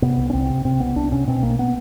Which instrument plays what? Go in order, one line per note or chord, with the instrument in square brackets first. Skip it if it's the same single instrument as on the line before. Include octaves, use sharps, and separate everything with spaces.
[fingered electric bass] C3 B3
C2
C#4
C2 C4
C3
C3 C4
C2 B3
C2 D4
C3 C#4
B2 C4
B1 A#3
B3